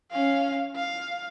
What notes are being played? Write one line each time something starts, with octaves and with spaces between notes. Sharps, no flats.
C#4 F5
F5